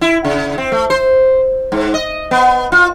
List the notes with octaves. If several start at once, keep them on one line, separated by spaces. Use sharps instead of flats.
E4
C#3
C4
A3
C5
G#2
D#5
B3
F4